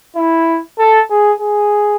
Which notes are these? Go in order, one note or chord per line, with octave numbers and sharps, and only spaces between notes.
E4
A4
G#4
G#4